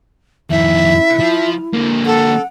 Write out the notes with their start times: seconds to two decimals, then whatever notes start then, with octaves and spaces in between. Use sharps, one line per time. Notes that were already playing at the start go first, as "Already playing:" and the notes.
0.51 F2 D#3 E4 E5
1.20 F3
1.73 D3 A#3
2.06 A4 F#5